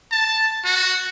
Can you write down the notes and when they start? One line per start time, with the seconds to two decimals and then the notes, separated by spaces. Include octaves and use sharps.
0.12 A5
0.65 F#4